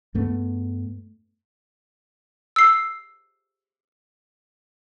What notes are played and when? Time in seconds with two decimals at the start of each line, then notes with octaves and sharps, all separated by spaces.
0.14 G2 A3 B3
2.56 E6 C7